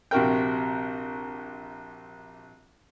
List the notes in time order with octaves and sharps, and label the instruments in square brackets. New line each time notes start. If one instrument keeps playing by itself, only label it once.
[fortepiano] A#1 C3 F#4 A#4 G5